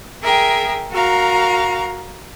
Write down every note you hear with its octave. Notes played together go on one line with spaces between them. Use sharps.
G#4 A#4 E5 G5
F#4 A#4 F5 A#5